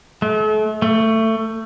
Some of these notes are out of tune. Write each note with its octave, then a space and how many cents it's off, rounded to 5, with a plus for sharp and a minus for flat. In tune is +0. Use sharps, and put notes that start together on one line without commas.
A3 -40
A3 +20